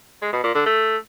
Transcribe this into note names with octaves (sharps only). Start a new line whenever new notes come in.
G#3
B2
A#2
D3
A3